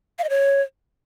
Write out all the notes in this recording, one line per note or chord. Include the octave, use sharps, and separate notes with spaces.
F5
D#5
C#5